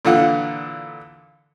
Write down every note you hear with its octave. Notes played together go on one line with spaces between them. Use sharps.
A#2 D3 E3 F4 F#5